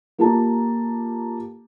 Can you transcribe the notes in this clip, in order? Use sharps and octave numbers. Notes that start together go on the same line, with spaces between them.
A#3 F4 G4 A4 A5 A#5